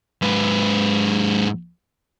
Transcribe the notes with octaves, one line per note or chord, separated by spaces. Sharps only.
G#2 B4